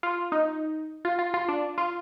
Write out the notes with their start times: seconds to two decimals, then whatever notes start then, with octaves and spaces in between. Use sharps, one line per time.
0.03 F4
0.32 D#4
1.05 F4
1.19 F4
1.34 F4
1.49 D4
1.78 F4